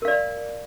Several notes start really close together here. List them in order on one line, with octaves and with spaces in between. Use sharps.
A#4 F5 D5